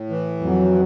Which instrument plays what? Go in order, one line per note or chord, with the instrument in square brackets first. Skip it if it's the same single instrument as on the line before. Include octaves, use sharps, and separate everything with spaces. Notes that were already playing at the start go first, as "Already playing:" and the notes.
Already playing: [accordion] A2
E3
[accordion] F2 [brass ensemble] F#3